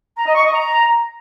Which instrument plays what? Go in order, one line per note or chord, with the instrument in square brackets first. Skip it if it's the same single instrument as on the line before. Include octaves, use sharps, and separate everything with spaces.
[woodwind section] A#5
D#5
C#6
D#5
A#5